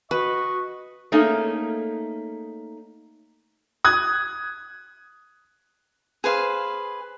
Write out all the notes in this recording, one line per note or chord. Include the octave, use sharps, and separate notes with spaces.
F#4 B4 D#5 C#6
A3 A#3 C#4 D#4 G#4
D#6 F#6 G#6
G#4 B4 C5 F5